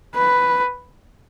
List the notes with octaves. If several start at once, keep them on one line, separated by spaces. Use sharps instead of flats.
B4